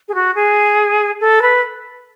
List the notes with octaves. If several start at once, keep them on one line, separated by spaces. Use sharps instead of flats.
G#4
F#4
G#4
A4
B4